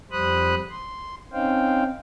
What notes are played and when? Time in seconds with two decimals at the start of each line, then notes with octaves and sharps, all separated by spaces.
0.11 F2 G3 C5 B5 D#6 F#6
0.70 C6
1.33 C4 C#4 D#4 C5 F5 G5